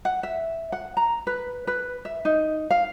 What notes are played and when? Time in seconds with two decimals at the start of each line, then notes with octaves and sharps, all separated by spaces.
0.05 F#5
0.23 E5
0.72 F#5
0.97 A#5
1.27 B4
1.67 B4
2.05 E5
2.25 D#4
2.71 F5